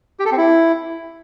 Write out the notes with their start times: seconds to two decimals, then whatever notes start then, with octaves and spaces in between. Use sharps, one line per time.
0.19 G4
0.25 A4
0.31 C4
0.37 E4